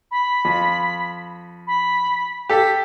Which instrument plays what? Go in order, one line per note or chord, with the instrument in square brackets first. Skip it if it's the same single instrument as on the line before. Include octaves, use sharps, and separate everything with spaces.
[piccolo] B5
[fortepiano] F2
[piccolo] B5
[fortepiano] G4 A4 [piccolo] B6